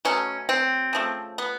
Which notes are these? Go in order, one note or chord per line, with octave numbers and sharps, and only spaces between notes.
B2 F#3 A3 C#4
C4
C#3 F3 A3
B3